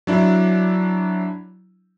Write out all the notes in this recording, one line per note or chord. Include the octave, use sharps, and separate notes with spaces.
F#3 D4 E4